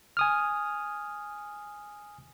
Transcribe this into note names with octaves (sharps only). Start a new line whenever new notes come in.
G#5 D#6 F6